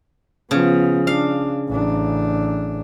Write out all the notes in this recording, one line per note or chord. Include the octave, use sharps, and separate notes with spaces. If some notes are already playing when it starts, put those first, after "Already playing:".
C#3 F3 B3
D4 F5
A1 D4